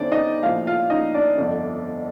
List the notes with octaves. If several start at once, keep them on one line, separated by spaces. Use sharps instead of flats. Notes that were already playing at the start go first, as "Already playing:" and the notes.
Already playing: G1 G2 D#3 C4 D4 D5
D#4 D#5
A#1 A2 F3 F4 F5
F4 F5
D#4 D#5
D4 D5
G1 F2 D3